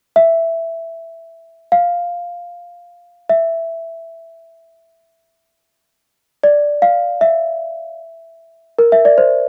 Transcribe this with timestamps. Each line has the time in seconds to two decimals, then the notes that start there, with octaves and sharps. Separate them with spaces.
0.16 E5
1.72 F5
3.30 E5
6.44 D5
6.82 F5
7.21 E5
8.79 A#4
8.92 E5
9.05 D5
9.18 C5